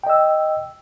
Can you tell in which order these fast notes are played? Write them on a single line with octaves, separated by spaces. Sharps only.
G5 D#5 E6